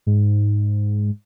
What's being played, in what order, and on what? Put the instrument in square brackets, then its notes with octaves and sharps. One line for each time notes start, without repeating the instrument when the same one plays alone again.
[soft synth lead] G#2